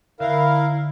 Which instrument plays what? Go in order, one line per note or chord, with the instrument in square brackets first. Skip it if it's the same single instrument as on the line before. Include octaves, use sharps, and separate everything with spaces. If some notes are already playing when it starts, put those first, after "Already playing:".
[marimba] D3 [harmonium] E4 A#4 F5